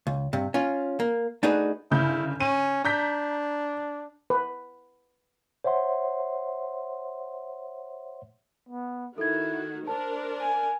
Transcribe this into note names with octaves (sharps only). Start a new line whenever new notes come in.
C#2
G2 C3
C#4 F4
A#3
A3 D4 D#4 F#4 G#4 B4
G1 C#3 E4 G6
C#4 D#7
D4 A#5 G6 B6
B4
C5 C#5 E5 F#5 C6
B3
D#3 E4 F#4 A4 G#6
D4 A#4 C5 A5
G#5